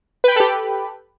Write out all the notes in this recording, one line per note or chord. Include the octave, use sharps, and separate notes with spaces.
G4 A4 B4 G5 B5